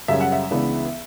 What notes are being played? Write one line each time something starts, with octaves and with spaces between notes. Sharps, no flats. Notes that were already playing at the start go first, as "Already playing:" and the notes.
F#2 C#3 G3 C#4 E5
F#5
E5
C#2 C#3 E3 B3 D4